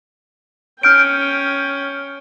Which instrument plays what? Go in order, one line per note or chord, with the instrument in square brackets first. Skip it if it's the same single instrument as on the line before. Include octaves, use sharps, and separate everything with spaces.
[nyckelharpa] C#4 G5 [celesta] F6 G6 D7